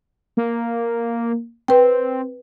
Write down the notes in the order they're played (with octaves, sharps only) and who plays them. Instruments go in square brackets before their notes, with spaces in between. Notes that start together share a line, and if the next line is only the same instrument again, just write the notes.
[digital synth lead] A#3
[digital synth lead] C4 [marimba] B4 G5